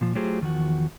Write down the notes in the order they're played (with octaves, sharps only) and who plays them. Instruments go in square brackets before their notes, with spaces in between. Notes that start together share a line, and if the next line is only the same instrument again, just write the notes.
[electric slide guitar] A#2 F3
F#3 A3 F4 G4 G#4 C5
E2 D#3 F3 F#4